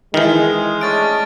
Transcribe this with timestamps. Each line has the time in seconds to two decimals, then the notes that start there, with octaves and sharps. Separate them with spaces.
0.14 D#3 E3 G#3 D#6 F6 G6
0.81 A3 C#4 D4 C#6 A6 D7